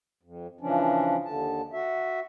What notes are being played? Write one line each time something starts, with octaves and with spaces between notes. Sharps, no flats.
F2
C#3 E3 F3 C#4 D4
D#2 D3 A5
F#4 E5